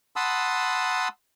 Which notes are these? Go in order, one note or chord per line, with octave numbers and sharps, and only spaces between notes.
F#5 A5 B5 C6 D#6 E6